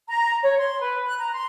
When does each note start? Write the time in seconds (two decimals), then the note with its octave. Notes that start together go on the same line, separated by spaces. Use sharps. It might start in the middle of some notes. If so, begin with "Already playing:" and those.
0.09 A#5
0.42 C#5
0.58 C6
0.80 B4
1.07 F#6
1.19 A#5
1.33 C6